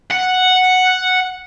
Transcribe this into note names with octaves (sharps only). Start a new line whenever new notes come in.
F#5